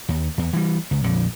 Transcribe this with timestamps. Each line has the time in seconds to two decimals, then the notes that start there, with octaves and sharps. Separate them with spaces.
0.09 D#2
0.38 E2
0.53 E3 G3
0.91 C#2
1.04 A#1 F2 D3